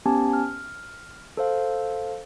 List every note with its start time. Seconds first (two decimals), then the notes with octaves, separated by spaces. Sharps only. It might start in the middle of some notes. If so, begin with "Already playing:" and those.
0.06 B3 C#4 G4 G#5 A5
0.33 F6
1.37 A4 C5 F5